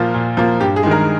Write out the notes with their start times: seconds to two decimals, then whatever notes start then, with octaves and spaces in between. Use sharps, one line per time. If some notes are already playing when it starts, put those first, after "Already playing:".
Already playing: A#2 F3 A#3 F4
0.14 A#2
0.37 F3 A#3
0.60 G2 G4
0.76 G#4
0.83 D#3 G#3
0.91 A#4